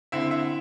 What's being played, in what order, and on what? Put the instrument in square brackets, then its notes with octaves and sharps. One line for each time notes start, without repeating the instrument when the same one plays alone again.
[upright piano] D3 C4 E4 E5
E4 E5